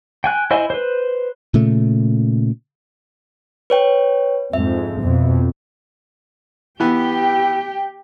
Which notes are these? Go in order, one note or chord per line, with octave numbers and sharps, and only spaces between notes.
G5 G#5 F#6
E4 C5 D#5 E5 G#5
B4 C5
A#2 C#3 A3
B4 C#5 G5
F2 G#2 E5
F2 B2
E3 B3 G4 G5